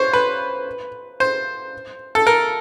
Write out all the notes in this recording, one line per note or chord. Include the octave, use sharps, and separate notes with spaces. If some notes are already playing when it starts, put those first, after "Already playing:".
Already playing: C5 C#5
B4
C5
A4
A#4